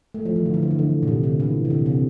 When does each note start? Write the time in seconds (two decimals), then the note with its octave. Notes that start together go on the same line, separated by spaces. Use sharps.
0.14 A3
0.25 F3
0.36 E3
0.46 D3
0.54 E3
0.63 D3
0.71 E3
0.79 D3
1.03 A#2
1.08 C3
1.24 D3
1.40 E3
1.65 C3
1.70 D3
1.86 C3